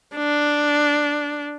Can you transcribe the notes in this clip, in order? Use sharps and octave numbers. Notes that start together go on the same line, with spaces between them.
D4